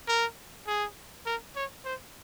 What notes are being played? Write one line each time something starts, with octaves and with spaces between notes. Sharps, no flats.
A#4
G#4
A#4
C#5
C5